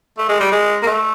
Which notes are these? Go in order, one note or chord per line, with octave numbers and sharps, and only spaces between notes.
A3
G#3
G3
G#3
A#3
A3